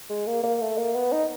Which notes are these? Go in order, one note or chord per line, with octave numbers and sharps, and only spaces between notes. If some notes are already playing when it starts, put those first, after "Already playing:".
G#3
A#3
A#3
A3
A#3
B3
D#4